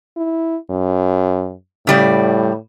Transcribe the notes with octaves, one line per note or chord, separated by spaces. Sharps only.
E4
F#2
A2 C#3 G3 D5